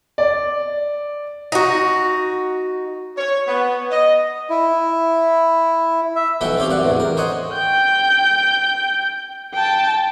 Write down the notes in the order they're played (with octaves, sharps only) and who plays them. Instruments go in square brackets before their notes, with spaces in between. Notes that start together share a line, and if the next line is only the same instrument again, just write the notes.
[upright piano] D5
[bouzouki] D#4 F#4
[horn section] C#5
B3
D#5
[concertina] E4
E5
[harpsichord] B1 B2 E3 B4 F#5 G5
C4 C#4 G4 F5
F#2 C3 D5 F#5
E2 A2 D3
A#4
C5 C#5 D#5 F#5
[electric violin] G5 G6
G5 A5